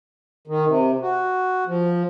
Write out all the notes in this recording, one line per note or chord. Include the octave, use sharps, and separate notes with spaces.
D#3
C3
F#4
F3